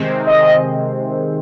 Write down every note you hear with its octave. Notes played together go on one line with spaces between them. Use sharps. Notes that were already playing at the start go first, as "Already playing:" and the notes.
Already playing: C3 D#3 G#3 C4
D#5